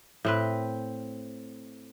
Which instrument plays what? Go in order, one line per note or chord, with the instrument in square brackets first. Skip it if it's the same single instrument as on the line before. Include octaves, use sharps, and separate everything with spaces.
[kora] A2 C4 B4